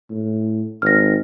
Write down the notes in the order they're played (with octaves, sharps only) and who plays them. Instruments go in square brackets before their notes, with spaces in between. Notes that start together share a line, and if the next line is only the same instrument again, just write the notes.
[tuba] A2
[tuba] G#1 [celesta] F6 A#6